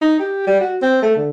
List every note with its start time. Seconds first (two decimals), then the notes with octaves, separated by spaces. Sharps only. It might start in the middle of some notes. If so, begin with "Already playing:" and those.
0.02 D#4
0.19 G4
0.47 G3
0.61 F#4
0.82 C4
1.02 A3
1.16 D3